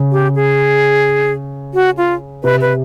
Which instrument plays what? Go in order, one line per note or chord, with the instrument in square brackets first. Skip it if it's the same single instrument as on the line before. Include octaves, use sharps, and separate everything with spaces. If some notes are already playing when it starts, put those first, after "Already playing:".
Already playing: [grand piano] C#3
[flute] G4
G#4
F#4
F4
[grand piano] C3 [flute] B4
[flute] B4